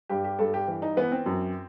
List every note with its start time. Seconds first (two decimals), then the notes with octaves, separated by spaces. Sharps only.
0.09 G2 G4
0.24 G4
0.39 G2 A4
0.54 G4
0.68 E3
0.82 D#4
0.97 E3 B3
1.12 C4
1.26 F#2